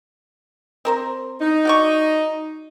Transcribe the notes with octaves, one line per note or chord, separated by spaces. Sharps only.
C4 A#4 C5
D#4
F#4 D5 C#6